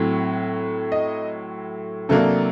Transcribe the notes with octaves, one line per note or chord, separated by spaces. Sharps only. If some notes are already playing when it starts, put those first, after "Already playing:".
Already playing: A2 F#3 C4
D#5
C3 F#3 A#3 D4 A4